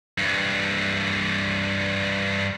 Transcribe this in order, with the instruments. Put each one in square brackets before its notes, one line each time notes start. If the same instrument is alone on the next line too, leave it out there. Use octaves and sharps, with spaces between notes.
[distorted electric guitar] G2 E3